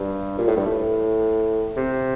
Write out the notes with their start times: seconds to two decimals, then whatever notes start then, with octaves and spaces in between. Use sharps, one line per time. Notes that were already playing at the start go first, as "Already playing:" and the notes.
Already playing: G2
0.38 A#2
0.48 A2
0.57 G2
0.66 A2
1.77 C3